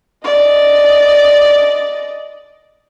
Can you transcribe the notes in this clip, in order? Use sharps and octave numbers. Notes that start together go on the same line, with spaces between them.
D5 D#5